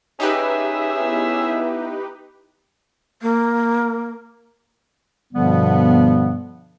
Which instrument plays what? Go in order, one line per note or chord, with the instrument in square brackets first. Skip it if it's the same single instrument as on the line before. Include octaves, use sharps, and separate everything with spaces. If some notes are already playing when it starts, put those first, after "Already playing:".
[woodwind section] C#4 G#4 E5 [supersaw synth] D#4 G4 B4
[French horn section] B3 E4
[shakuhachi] A#3
[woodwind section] G2 B2 D3 F3 G3 B3